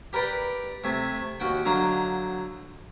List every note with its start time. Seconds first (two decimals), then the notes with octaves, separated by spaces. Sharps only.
0.13 G4 A#4 B4 D5 G5
0.84 C3 A3 G#5
1.40 D#2 F#4 F#5 G5
1.65 D3 F#3 D#4 F5 A#5